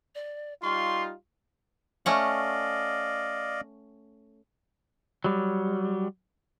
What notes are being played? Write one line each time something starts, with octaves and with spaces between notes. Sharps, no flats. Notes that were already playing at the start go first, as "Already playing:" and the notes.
D5
G3 D#4 F4 C6 C#6
A3 C#4 D5 D#5 F5 F#5
F#3 G3